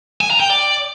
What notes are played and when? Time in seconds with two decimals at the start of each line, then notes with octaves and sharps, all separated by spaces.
0.21 G#5
0.31 A#5
0.40 G5
0.50 D5